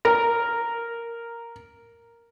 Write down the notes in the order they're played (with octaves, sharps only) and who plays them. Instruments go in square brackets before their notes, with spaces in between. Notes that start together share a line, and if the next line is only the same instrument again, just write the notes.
[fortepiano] A#4 A#5